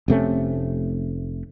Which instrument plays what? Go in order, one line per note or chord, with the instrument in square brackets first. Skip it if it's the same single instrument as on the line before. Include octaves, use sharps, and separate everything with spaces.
[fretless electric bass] F1 C3 A3 C#4